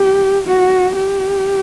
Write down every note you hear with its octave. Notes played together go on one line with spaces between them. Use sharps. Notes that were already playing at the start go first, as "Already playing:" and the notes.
Already playing: G4
F#4
G4